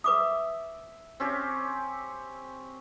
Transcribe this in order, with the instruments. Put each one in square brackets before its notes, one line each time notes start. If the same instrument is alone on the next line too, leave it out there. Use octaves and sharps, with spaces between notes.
[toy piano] B4 D6 D#6 [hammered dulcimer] E5
[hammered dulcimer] C4 C#4 G4